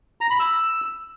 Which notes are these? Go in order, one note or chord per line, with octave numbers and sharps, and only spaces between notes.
A#5
B5
E6